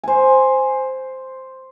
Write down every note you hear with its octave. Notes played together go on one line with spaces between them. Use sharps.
C5 G#5